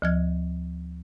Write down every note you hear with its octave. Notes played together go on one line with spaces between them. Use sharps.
D2 F3 G#6